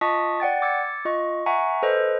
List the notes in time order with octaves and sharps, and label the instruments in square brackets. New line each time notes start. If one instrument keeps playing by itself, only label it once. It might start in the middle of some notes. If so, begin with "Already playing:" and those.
[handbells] F4 D#5 A5 C#6 D#6 B6
D5 F#5 G5 A6
D6 E6 G#6 A6 C#7
F4 D#5 C#6
E5 F#5 G#5 A#5 C#6
A4 B4 C5 D#5